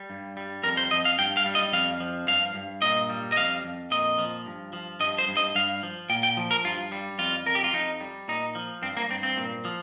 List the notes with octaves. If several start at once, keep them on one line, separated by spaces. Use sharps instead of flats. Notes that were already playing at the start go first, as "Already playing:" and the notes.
Already playing: G3
G2
G3
F2 A#4
C5
F2 D#5
F5
G2 G5
F5
G3
D#5
F2 F5
F3
G2 F5
G2
A#2 D#5
G3
D#5
F2 F5
F2
A#2 D#5
F3
G2
F3
G2 D#5
C5
G2
D#5
G2 F5
F3
A#2 G5
G5
F3
A#4
G2 F4
G3
F2 F4
F2 A#4
G4
F4
F2 D#4
G3
A#2 D#4
F3
G2 C4
A#3
G2 C4
C4
A#2
F3